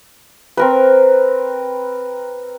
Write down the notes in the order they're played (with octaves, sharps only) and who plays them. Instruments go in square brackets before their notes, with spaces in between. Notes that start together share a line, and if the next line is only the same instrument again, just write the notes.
[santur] C4 A#4 B4